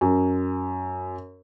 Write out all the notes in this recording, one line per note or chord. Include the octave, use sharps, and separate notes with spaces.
F#2